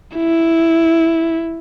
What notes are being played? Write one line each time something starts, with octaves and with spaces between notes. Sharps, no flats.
E4